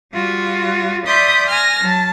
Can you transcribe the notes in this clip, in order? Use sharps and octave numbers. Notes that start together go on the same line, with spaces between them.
G3 F4 F#4
D5 E5 B5 C6 D#6 G6
G#5 F6 A#6
F#3 A5